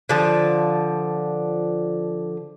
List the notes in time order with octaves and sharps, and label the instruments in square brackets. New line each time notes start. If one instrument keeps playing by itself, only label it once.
[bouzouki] D3 F3